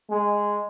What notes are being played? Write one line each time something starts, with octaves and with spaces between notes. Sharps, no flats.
G#3